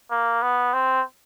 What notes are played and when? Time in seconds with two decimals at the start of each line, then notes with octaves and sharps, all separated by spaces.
0.11 A#3
0.42 B3
0.73 C4